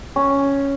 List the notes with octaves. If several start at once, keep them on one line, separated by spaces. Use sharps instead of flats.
C#4